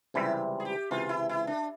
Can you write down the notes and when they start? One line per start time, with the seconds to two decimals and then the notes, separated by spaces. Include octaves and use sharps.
0.14 C#2 C3 E3 G3 C4 E4
0.60 G#4
0.65 G4
0.91 C#2 C3 E3 F4
1.09 E4
1.29 E4
1.47 D4